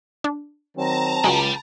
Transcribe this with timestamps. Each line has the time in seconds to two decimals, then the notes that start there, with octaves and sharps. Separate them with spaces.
0.24 D4
0.77 D#3 F#3 C4 A5 A#5
1.24 C#2 F#3 G#3 G5 B5